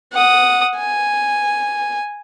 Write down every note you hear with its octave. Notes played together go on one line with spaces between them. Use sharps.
F#5 D#6
G#5